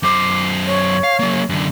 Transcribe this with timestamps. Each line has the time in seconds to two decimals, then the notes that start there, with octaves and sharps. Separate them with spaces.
0.03 F#2 C5 D6
0.66 C#5
1.04 F5
1.19 F#3 A#3
1.49 F#2 D3